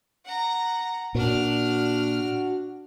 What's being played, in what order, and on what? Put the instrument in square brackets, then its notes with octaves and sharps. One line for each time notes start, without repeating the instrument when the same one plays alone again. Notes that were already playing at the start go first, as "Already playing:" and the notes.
[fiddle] F#5 A#5
[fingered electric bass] A#2 [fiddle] D4 F6 [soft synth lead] F#4